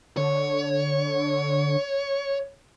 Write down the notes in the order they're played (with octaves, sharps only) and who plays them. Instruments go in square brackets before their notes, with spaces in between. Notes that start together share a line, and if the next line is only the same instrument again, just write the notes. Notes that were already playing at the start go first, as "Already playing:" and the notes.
[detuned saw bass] D3 [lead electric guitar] C#5